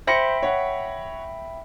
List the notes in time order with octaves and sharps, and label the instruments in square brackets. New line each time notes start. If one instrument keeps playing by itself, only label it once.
[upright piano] C5 A#6 C#7 [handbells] E5 G5 B5
[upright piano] C#5 F#5